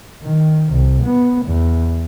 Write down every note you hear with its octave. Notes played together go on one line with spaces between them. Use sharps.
D#3
C2
B3
E2